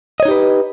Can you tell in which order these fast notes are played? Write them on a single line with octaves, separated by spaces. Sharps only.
D#5 C#5 D#4 G4 B4